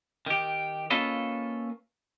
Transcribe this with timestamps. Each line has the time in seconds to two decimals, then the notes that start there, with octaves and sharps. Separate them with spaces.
0.26 D#3 G4
0.90 A#3 C#4 F4 A4 B4 D#5